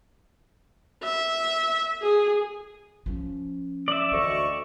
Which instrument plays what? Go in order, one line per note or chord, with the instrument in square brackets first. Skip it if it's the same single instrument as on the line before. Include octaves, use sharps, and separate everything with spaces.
[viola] E5
G#4
[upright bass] F3 C#4
[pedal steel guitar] D5 E5
[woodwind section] D2 D#5 C#6 [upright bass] E3